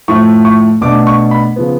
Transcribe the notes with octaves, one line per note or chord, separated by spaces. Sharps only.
A2 F3 A3 C#6
C#6
B2 A3 D4 D6
C#6
B5
C#3 F3 B3